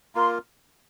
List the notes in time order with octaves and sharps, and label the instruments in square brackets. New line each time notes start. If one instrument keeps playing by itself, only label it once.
[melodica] A#3 F4 A#4 [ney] C6